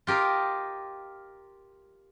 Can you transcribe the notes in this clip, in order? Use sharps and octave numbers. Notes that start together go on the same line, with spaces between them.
F4 G4 A#4 D#5 F5